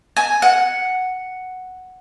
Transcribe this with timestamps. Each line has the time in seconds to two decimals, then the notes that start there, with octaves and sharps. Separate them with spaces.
0.16 G#5
0.42 F#5